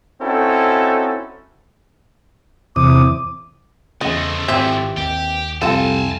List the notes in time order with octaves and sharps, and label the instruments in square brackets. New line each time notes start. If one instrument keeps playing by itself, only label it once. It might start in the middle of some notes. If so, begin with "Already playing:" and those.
[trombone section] C4 C#4 D#4 E4 F#4 A4
[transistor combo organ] E2 C3 D#6 [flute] D6
[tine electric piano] E2 C#3 [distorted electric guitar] F3 A3 [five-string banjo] D#5
[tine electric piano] G#1 G4 [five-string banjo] E3 C4 E5
[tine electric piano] D#2 [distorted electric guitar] G4
[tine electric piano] C2 F2 C3 [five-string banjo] F4 A4 [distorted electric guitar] G#5 A5